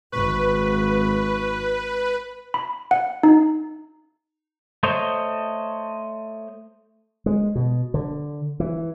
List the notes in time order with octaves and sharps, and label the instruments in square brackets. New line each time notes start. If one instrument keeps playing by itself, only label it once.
[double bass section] G#1 [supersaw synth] B4 [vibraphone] C#6
[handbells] B5
F#5
D#4
[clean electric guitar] A3 C5 C#5 D#5
[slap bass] G#3
B2
D3
E3